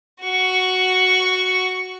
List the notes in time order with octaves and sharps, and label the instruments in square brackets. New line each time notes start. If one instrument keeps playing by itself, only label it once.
[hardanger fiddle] F#4 C#6